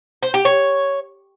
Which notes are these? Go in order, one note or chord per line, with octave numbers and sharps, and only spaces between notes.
C5
G4
C#5